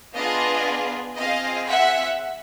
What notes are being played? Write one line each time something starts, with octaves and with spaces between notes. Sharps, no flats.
B3 D4 F4 G#4 D#5 F5
C4 F4 G#4 D#5 F5
E5 F#5